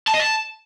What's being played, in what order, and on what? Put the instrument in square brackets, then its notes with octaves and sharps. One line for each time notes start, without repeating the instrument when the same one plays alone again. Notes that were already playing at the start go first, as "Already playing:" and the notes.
[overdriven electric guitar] A5
D#5
A5